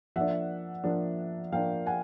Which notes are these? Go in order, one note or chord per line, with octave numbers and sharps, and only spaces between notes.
F3 A#3 D4 E5 F#5
F3 A#3 D4
F3 A#3 D4 F5 G5
F#5 G#5